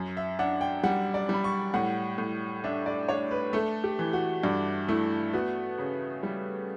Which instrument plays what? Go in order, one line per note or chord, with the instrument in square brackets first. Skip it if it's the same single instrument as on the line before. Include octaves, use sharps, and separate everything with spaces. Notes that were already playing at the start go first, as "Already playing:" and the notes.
Already playing: [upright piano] F#2
[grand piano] E5
[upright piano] D4 [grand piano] F#5
[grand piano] G5
[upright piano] G3 [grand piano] F#5
[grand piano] D5
[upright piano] G3 [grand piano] B5
[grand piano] C#6
[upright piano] A2 [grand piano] F#5
[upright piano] A2
[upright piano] D4 [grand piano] E5
[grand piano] D5
[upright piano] D4 [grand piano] C#5
[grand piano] B4
[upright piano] A3 [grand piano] A4
[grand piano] G4
[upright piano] E3
[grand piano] F#4
[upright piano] G2 [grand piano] D4
[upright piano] A3 [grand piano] E4
[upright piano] B3 [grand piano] F#4
[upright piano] C#3
G3